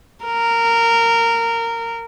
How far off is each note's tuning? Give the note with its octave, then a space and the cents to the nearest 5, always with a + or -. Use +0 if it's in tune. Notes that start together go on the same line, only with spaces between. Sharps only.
A#4 -15